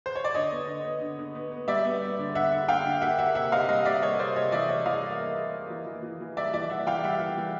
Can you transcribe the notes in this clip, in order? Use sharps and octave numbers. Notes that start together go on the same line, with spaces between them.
C5
C#5
D5
D3 C#5 D#5
B3
D3
B3
D3
D3
B3
B3
G3 D5 E5
B3
B3
D3
D3 E5 F#5
D3
D3 F5 G5
D3
A#3 E5 F#5
A#3 E5 F#5
C3 E5 F#5
C3 D#5 F5
G3 D#5 F5
C3 D5 E5
A#3 C#5 D#5
C3 C5 D5
C3 C#5 D#5
E3 D5 E5
G3 C#5 D#5
E3 D#5 F5
A#3
A#3
A#3
A#3
E3
E3
E3
E3
G3 D5 E5
E3 D5 E5
E3 E5 F#5
E3 F5 G5
G3 E5 F#5
E3
E3